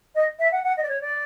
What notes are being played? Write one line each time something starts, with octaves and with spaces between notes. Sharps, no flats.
D#5
E5
F#5
F#5
D#5
D5
C#5
D5